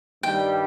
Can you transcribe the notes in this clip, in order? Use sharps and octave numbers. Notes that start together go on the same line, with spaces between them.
G2 D#3 G3 G5